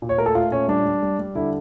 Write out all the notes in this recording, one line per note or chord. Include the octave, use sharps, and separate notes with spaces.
A#2
C#5
A3 A#4
A4
A3 F4
A#2 C#4
G3 D4
G3
G3
G3
D3 E4